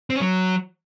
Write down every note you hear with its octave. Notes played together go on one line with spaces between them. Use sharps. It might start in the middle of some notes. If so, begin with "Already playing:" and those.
C4
C#4
F#3